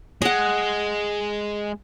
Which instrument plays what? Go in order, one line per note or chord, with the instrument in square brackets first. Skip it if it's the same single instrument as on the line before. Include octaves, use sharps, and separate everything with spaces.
[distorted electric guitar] G#3 [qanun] D#5 F#5